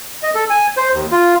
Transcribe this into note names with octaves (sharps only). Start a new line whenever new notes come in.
D#5
A4
G#5
C5
D#2
F4